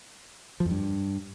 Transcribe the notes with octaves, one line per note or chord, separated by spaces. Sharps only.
F3
F2
G2